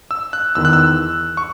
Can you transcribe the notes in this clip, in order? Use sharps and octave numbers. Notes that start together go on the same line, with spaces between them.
E6
F#6
E2 D#3 E6
F#6
E6
C#6